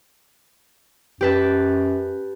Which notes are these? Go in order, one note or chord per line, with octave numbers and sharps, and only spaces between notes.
F#2 G4 B4 A5